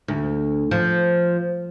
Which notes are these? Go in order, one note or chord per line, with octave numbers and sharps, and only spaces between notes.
D2
F3